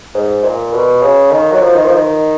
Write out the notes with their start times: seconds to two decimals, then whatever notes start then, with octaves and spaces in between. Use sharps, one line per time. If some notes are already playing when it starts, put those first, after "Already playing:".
0.15 G#2
0.44 A#2
0.73 B2
1.02 C#3
1.31 D#3
1.51 F#3
1.60 F3
1.74 D#3
1.84 F3
1.93 D#3